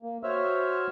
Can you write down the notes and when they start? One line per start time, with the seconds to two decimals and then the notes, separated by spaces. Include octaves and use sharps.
0.03 A#3
0.24 F#4 C5 C#5 E5 E6 F6